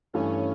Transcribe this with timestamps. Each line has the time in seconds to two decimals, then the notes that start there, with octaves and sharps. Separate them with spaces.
0.13 G2 E3 A3 C#4